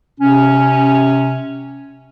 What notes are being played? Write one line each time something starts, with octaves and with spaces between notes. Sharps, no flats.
C3 C#4